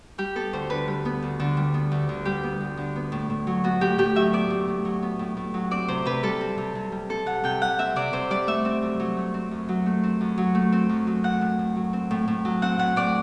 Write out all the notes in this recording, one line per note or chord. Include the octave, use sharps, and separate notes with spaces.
G3 G4
B3 A4
D2 C5
D3 B4
G3
B3
D2
D3
G3
B3
D2
D3
G3 G4
B3
D2
D3
B3
A2
A2
F#3
B3 F#4
A2 G4
A2 G4
F#3 E5
B3 D5
A2
A2
F#3
B3
A2
A2
F#3
C4 D5
C3 C5
C3 B4
G3 A4
C4
C3
C3
G3
C4 A4
C3 F#5
C3 G5
G3 F#5
C4 E5
C3 D5
C3 C5
G3 D5
A3 E5
C4
F#2
F#3
A3
C4
F#2
F#3
A3
C4
F#2
F#3
A3
C4
F#2
F#3
C4 F#5
A2
A2
F#3
C4
A2
A2
F#3
C4 F#5
A2 F#5
A2 D5